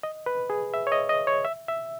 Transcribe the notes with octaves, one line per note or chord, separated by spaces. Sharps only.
D#5
B4
G#4
E5
C#5
D#5
D#5
C#5
E5
E5